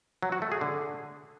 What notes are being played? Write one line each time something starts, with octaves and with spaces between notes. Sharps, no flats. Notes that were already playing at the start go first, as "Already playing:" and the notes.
F#3
F#4
A3
G#4
D3